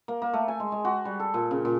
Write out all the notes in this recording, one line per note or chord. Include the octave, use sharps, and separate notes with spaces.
A#3
A#3
A3
G#5
G#3
G#3
F#4
G3
A4
A#2
C#3
A#2